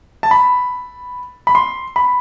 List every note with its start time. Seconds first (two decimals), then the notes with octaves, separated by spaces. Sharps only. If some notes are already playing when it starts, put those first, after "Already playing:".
0.23 A5
0.31 B5
1.47 B5
1.55 C6
1.96 B5